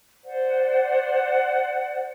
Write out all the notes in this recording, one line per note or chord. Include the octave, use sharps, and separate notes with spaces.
C5 D5 F#5